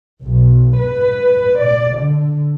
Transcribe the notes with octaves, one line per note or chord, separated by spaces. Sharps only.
B1
B4
D5
D3